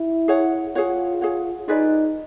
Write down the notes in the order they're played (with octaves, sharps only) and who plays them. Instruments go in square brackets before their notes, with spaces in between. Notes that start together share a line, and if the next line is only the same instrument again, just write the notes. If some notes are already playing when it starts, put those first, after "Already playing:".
Already playing: [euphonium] E4
[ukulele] G#4 C#5 F#5
[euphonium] F4 [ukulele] G#4 C#5 F#5
[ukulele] G#4 C#5 F#5
[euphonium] D#4 [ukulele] F4 G#4 B4 D5